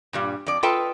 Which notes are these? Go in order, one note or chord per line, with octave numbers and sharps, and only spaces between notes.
G2 A#2 G3
F2 D5
F4 A4 B4 D#5 G5 A5